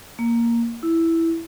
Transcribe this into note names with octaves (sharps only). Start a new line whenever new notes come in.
A#3
E4